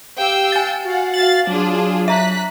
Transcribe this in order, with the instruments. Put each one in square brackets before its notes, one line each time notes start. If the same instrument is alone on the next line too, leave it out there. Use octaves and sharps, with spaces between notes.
[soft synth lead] G4 [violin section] F5 G5 E6
[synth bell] G#5 A6
[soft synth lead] F#4 [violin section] F5 F#5
[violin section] F5 A6 [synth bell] F#7
[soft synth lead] F#3 [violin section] D4 F4 G#4
[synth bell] E5 A#5 [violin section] F#6 B6